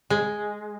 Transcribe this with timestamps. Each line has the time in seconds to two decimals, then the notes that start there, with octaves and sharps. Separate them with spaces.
0.10 G#3